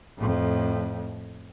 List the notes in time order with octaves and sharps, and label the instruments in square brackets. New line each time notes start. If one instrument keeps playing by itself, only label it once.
[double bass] F2 A2